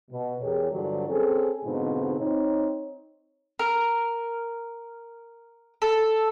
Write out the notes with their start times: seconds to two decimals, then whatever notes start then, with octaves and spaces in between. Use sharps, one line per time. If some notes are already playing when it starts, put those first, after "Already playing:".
0.11 B2
0.41 E2 E3 G4 G#4 A#4 C#5
0.72 G2 D3 F3 F#3 F#4 D5
1.09 C4 C#4 G#4 A4
1.64 G#2 B2 D3 C4 D#4 F4
2.19 C4 D#4 C#5
3.59 A#4
5.82 A4